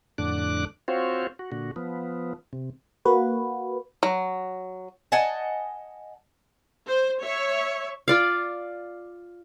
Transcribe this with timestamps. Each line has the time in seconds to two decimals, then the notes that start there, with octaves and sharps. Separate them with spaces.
0.18 F2 A2 D3 D4 D6 F#6
0.88 C4 F4 F#4 C5 C#5
1.39 F#4
1.52 A#2 D3 F#4
1.76 F3 B3
2.53 C3
3.05 A#3 F#4 B4
4.03 F#3
5.12 D#5 F#5 G#5 A5
6.89 C5
7.22 C#5 E5
8.08 F4 D5 F5